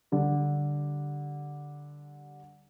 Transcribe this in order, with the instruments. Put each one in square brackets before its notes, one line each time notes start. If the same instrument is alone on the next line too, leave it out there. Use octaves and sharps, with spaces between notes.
[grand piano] D3 G3